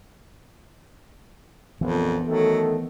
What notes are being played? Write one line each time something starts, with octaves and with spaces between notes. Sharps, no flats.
A#1 F2 E3 B3
D#3 F#3 A3 A4